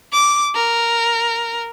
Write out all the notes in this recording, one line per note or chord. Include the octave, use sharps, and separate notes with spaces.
D6
A#4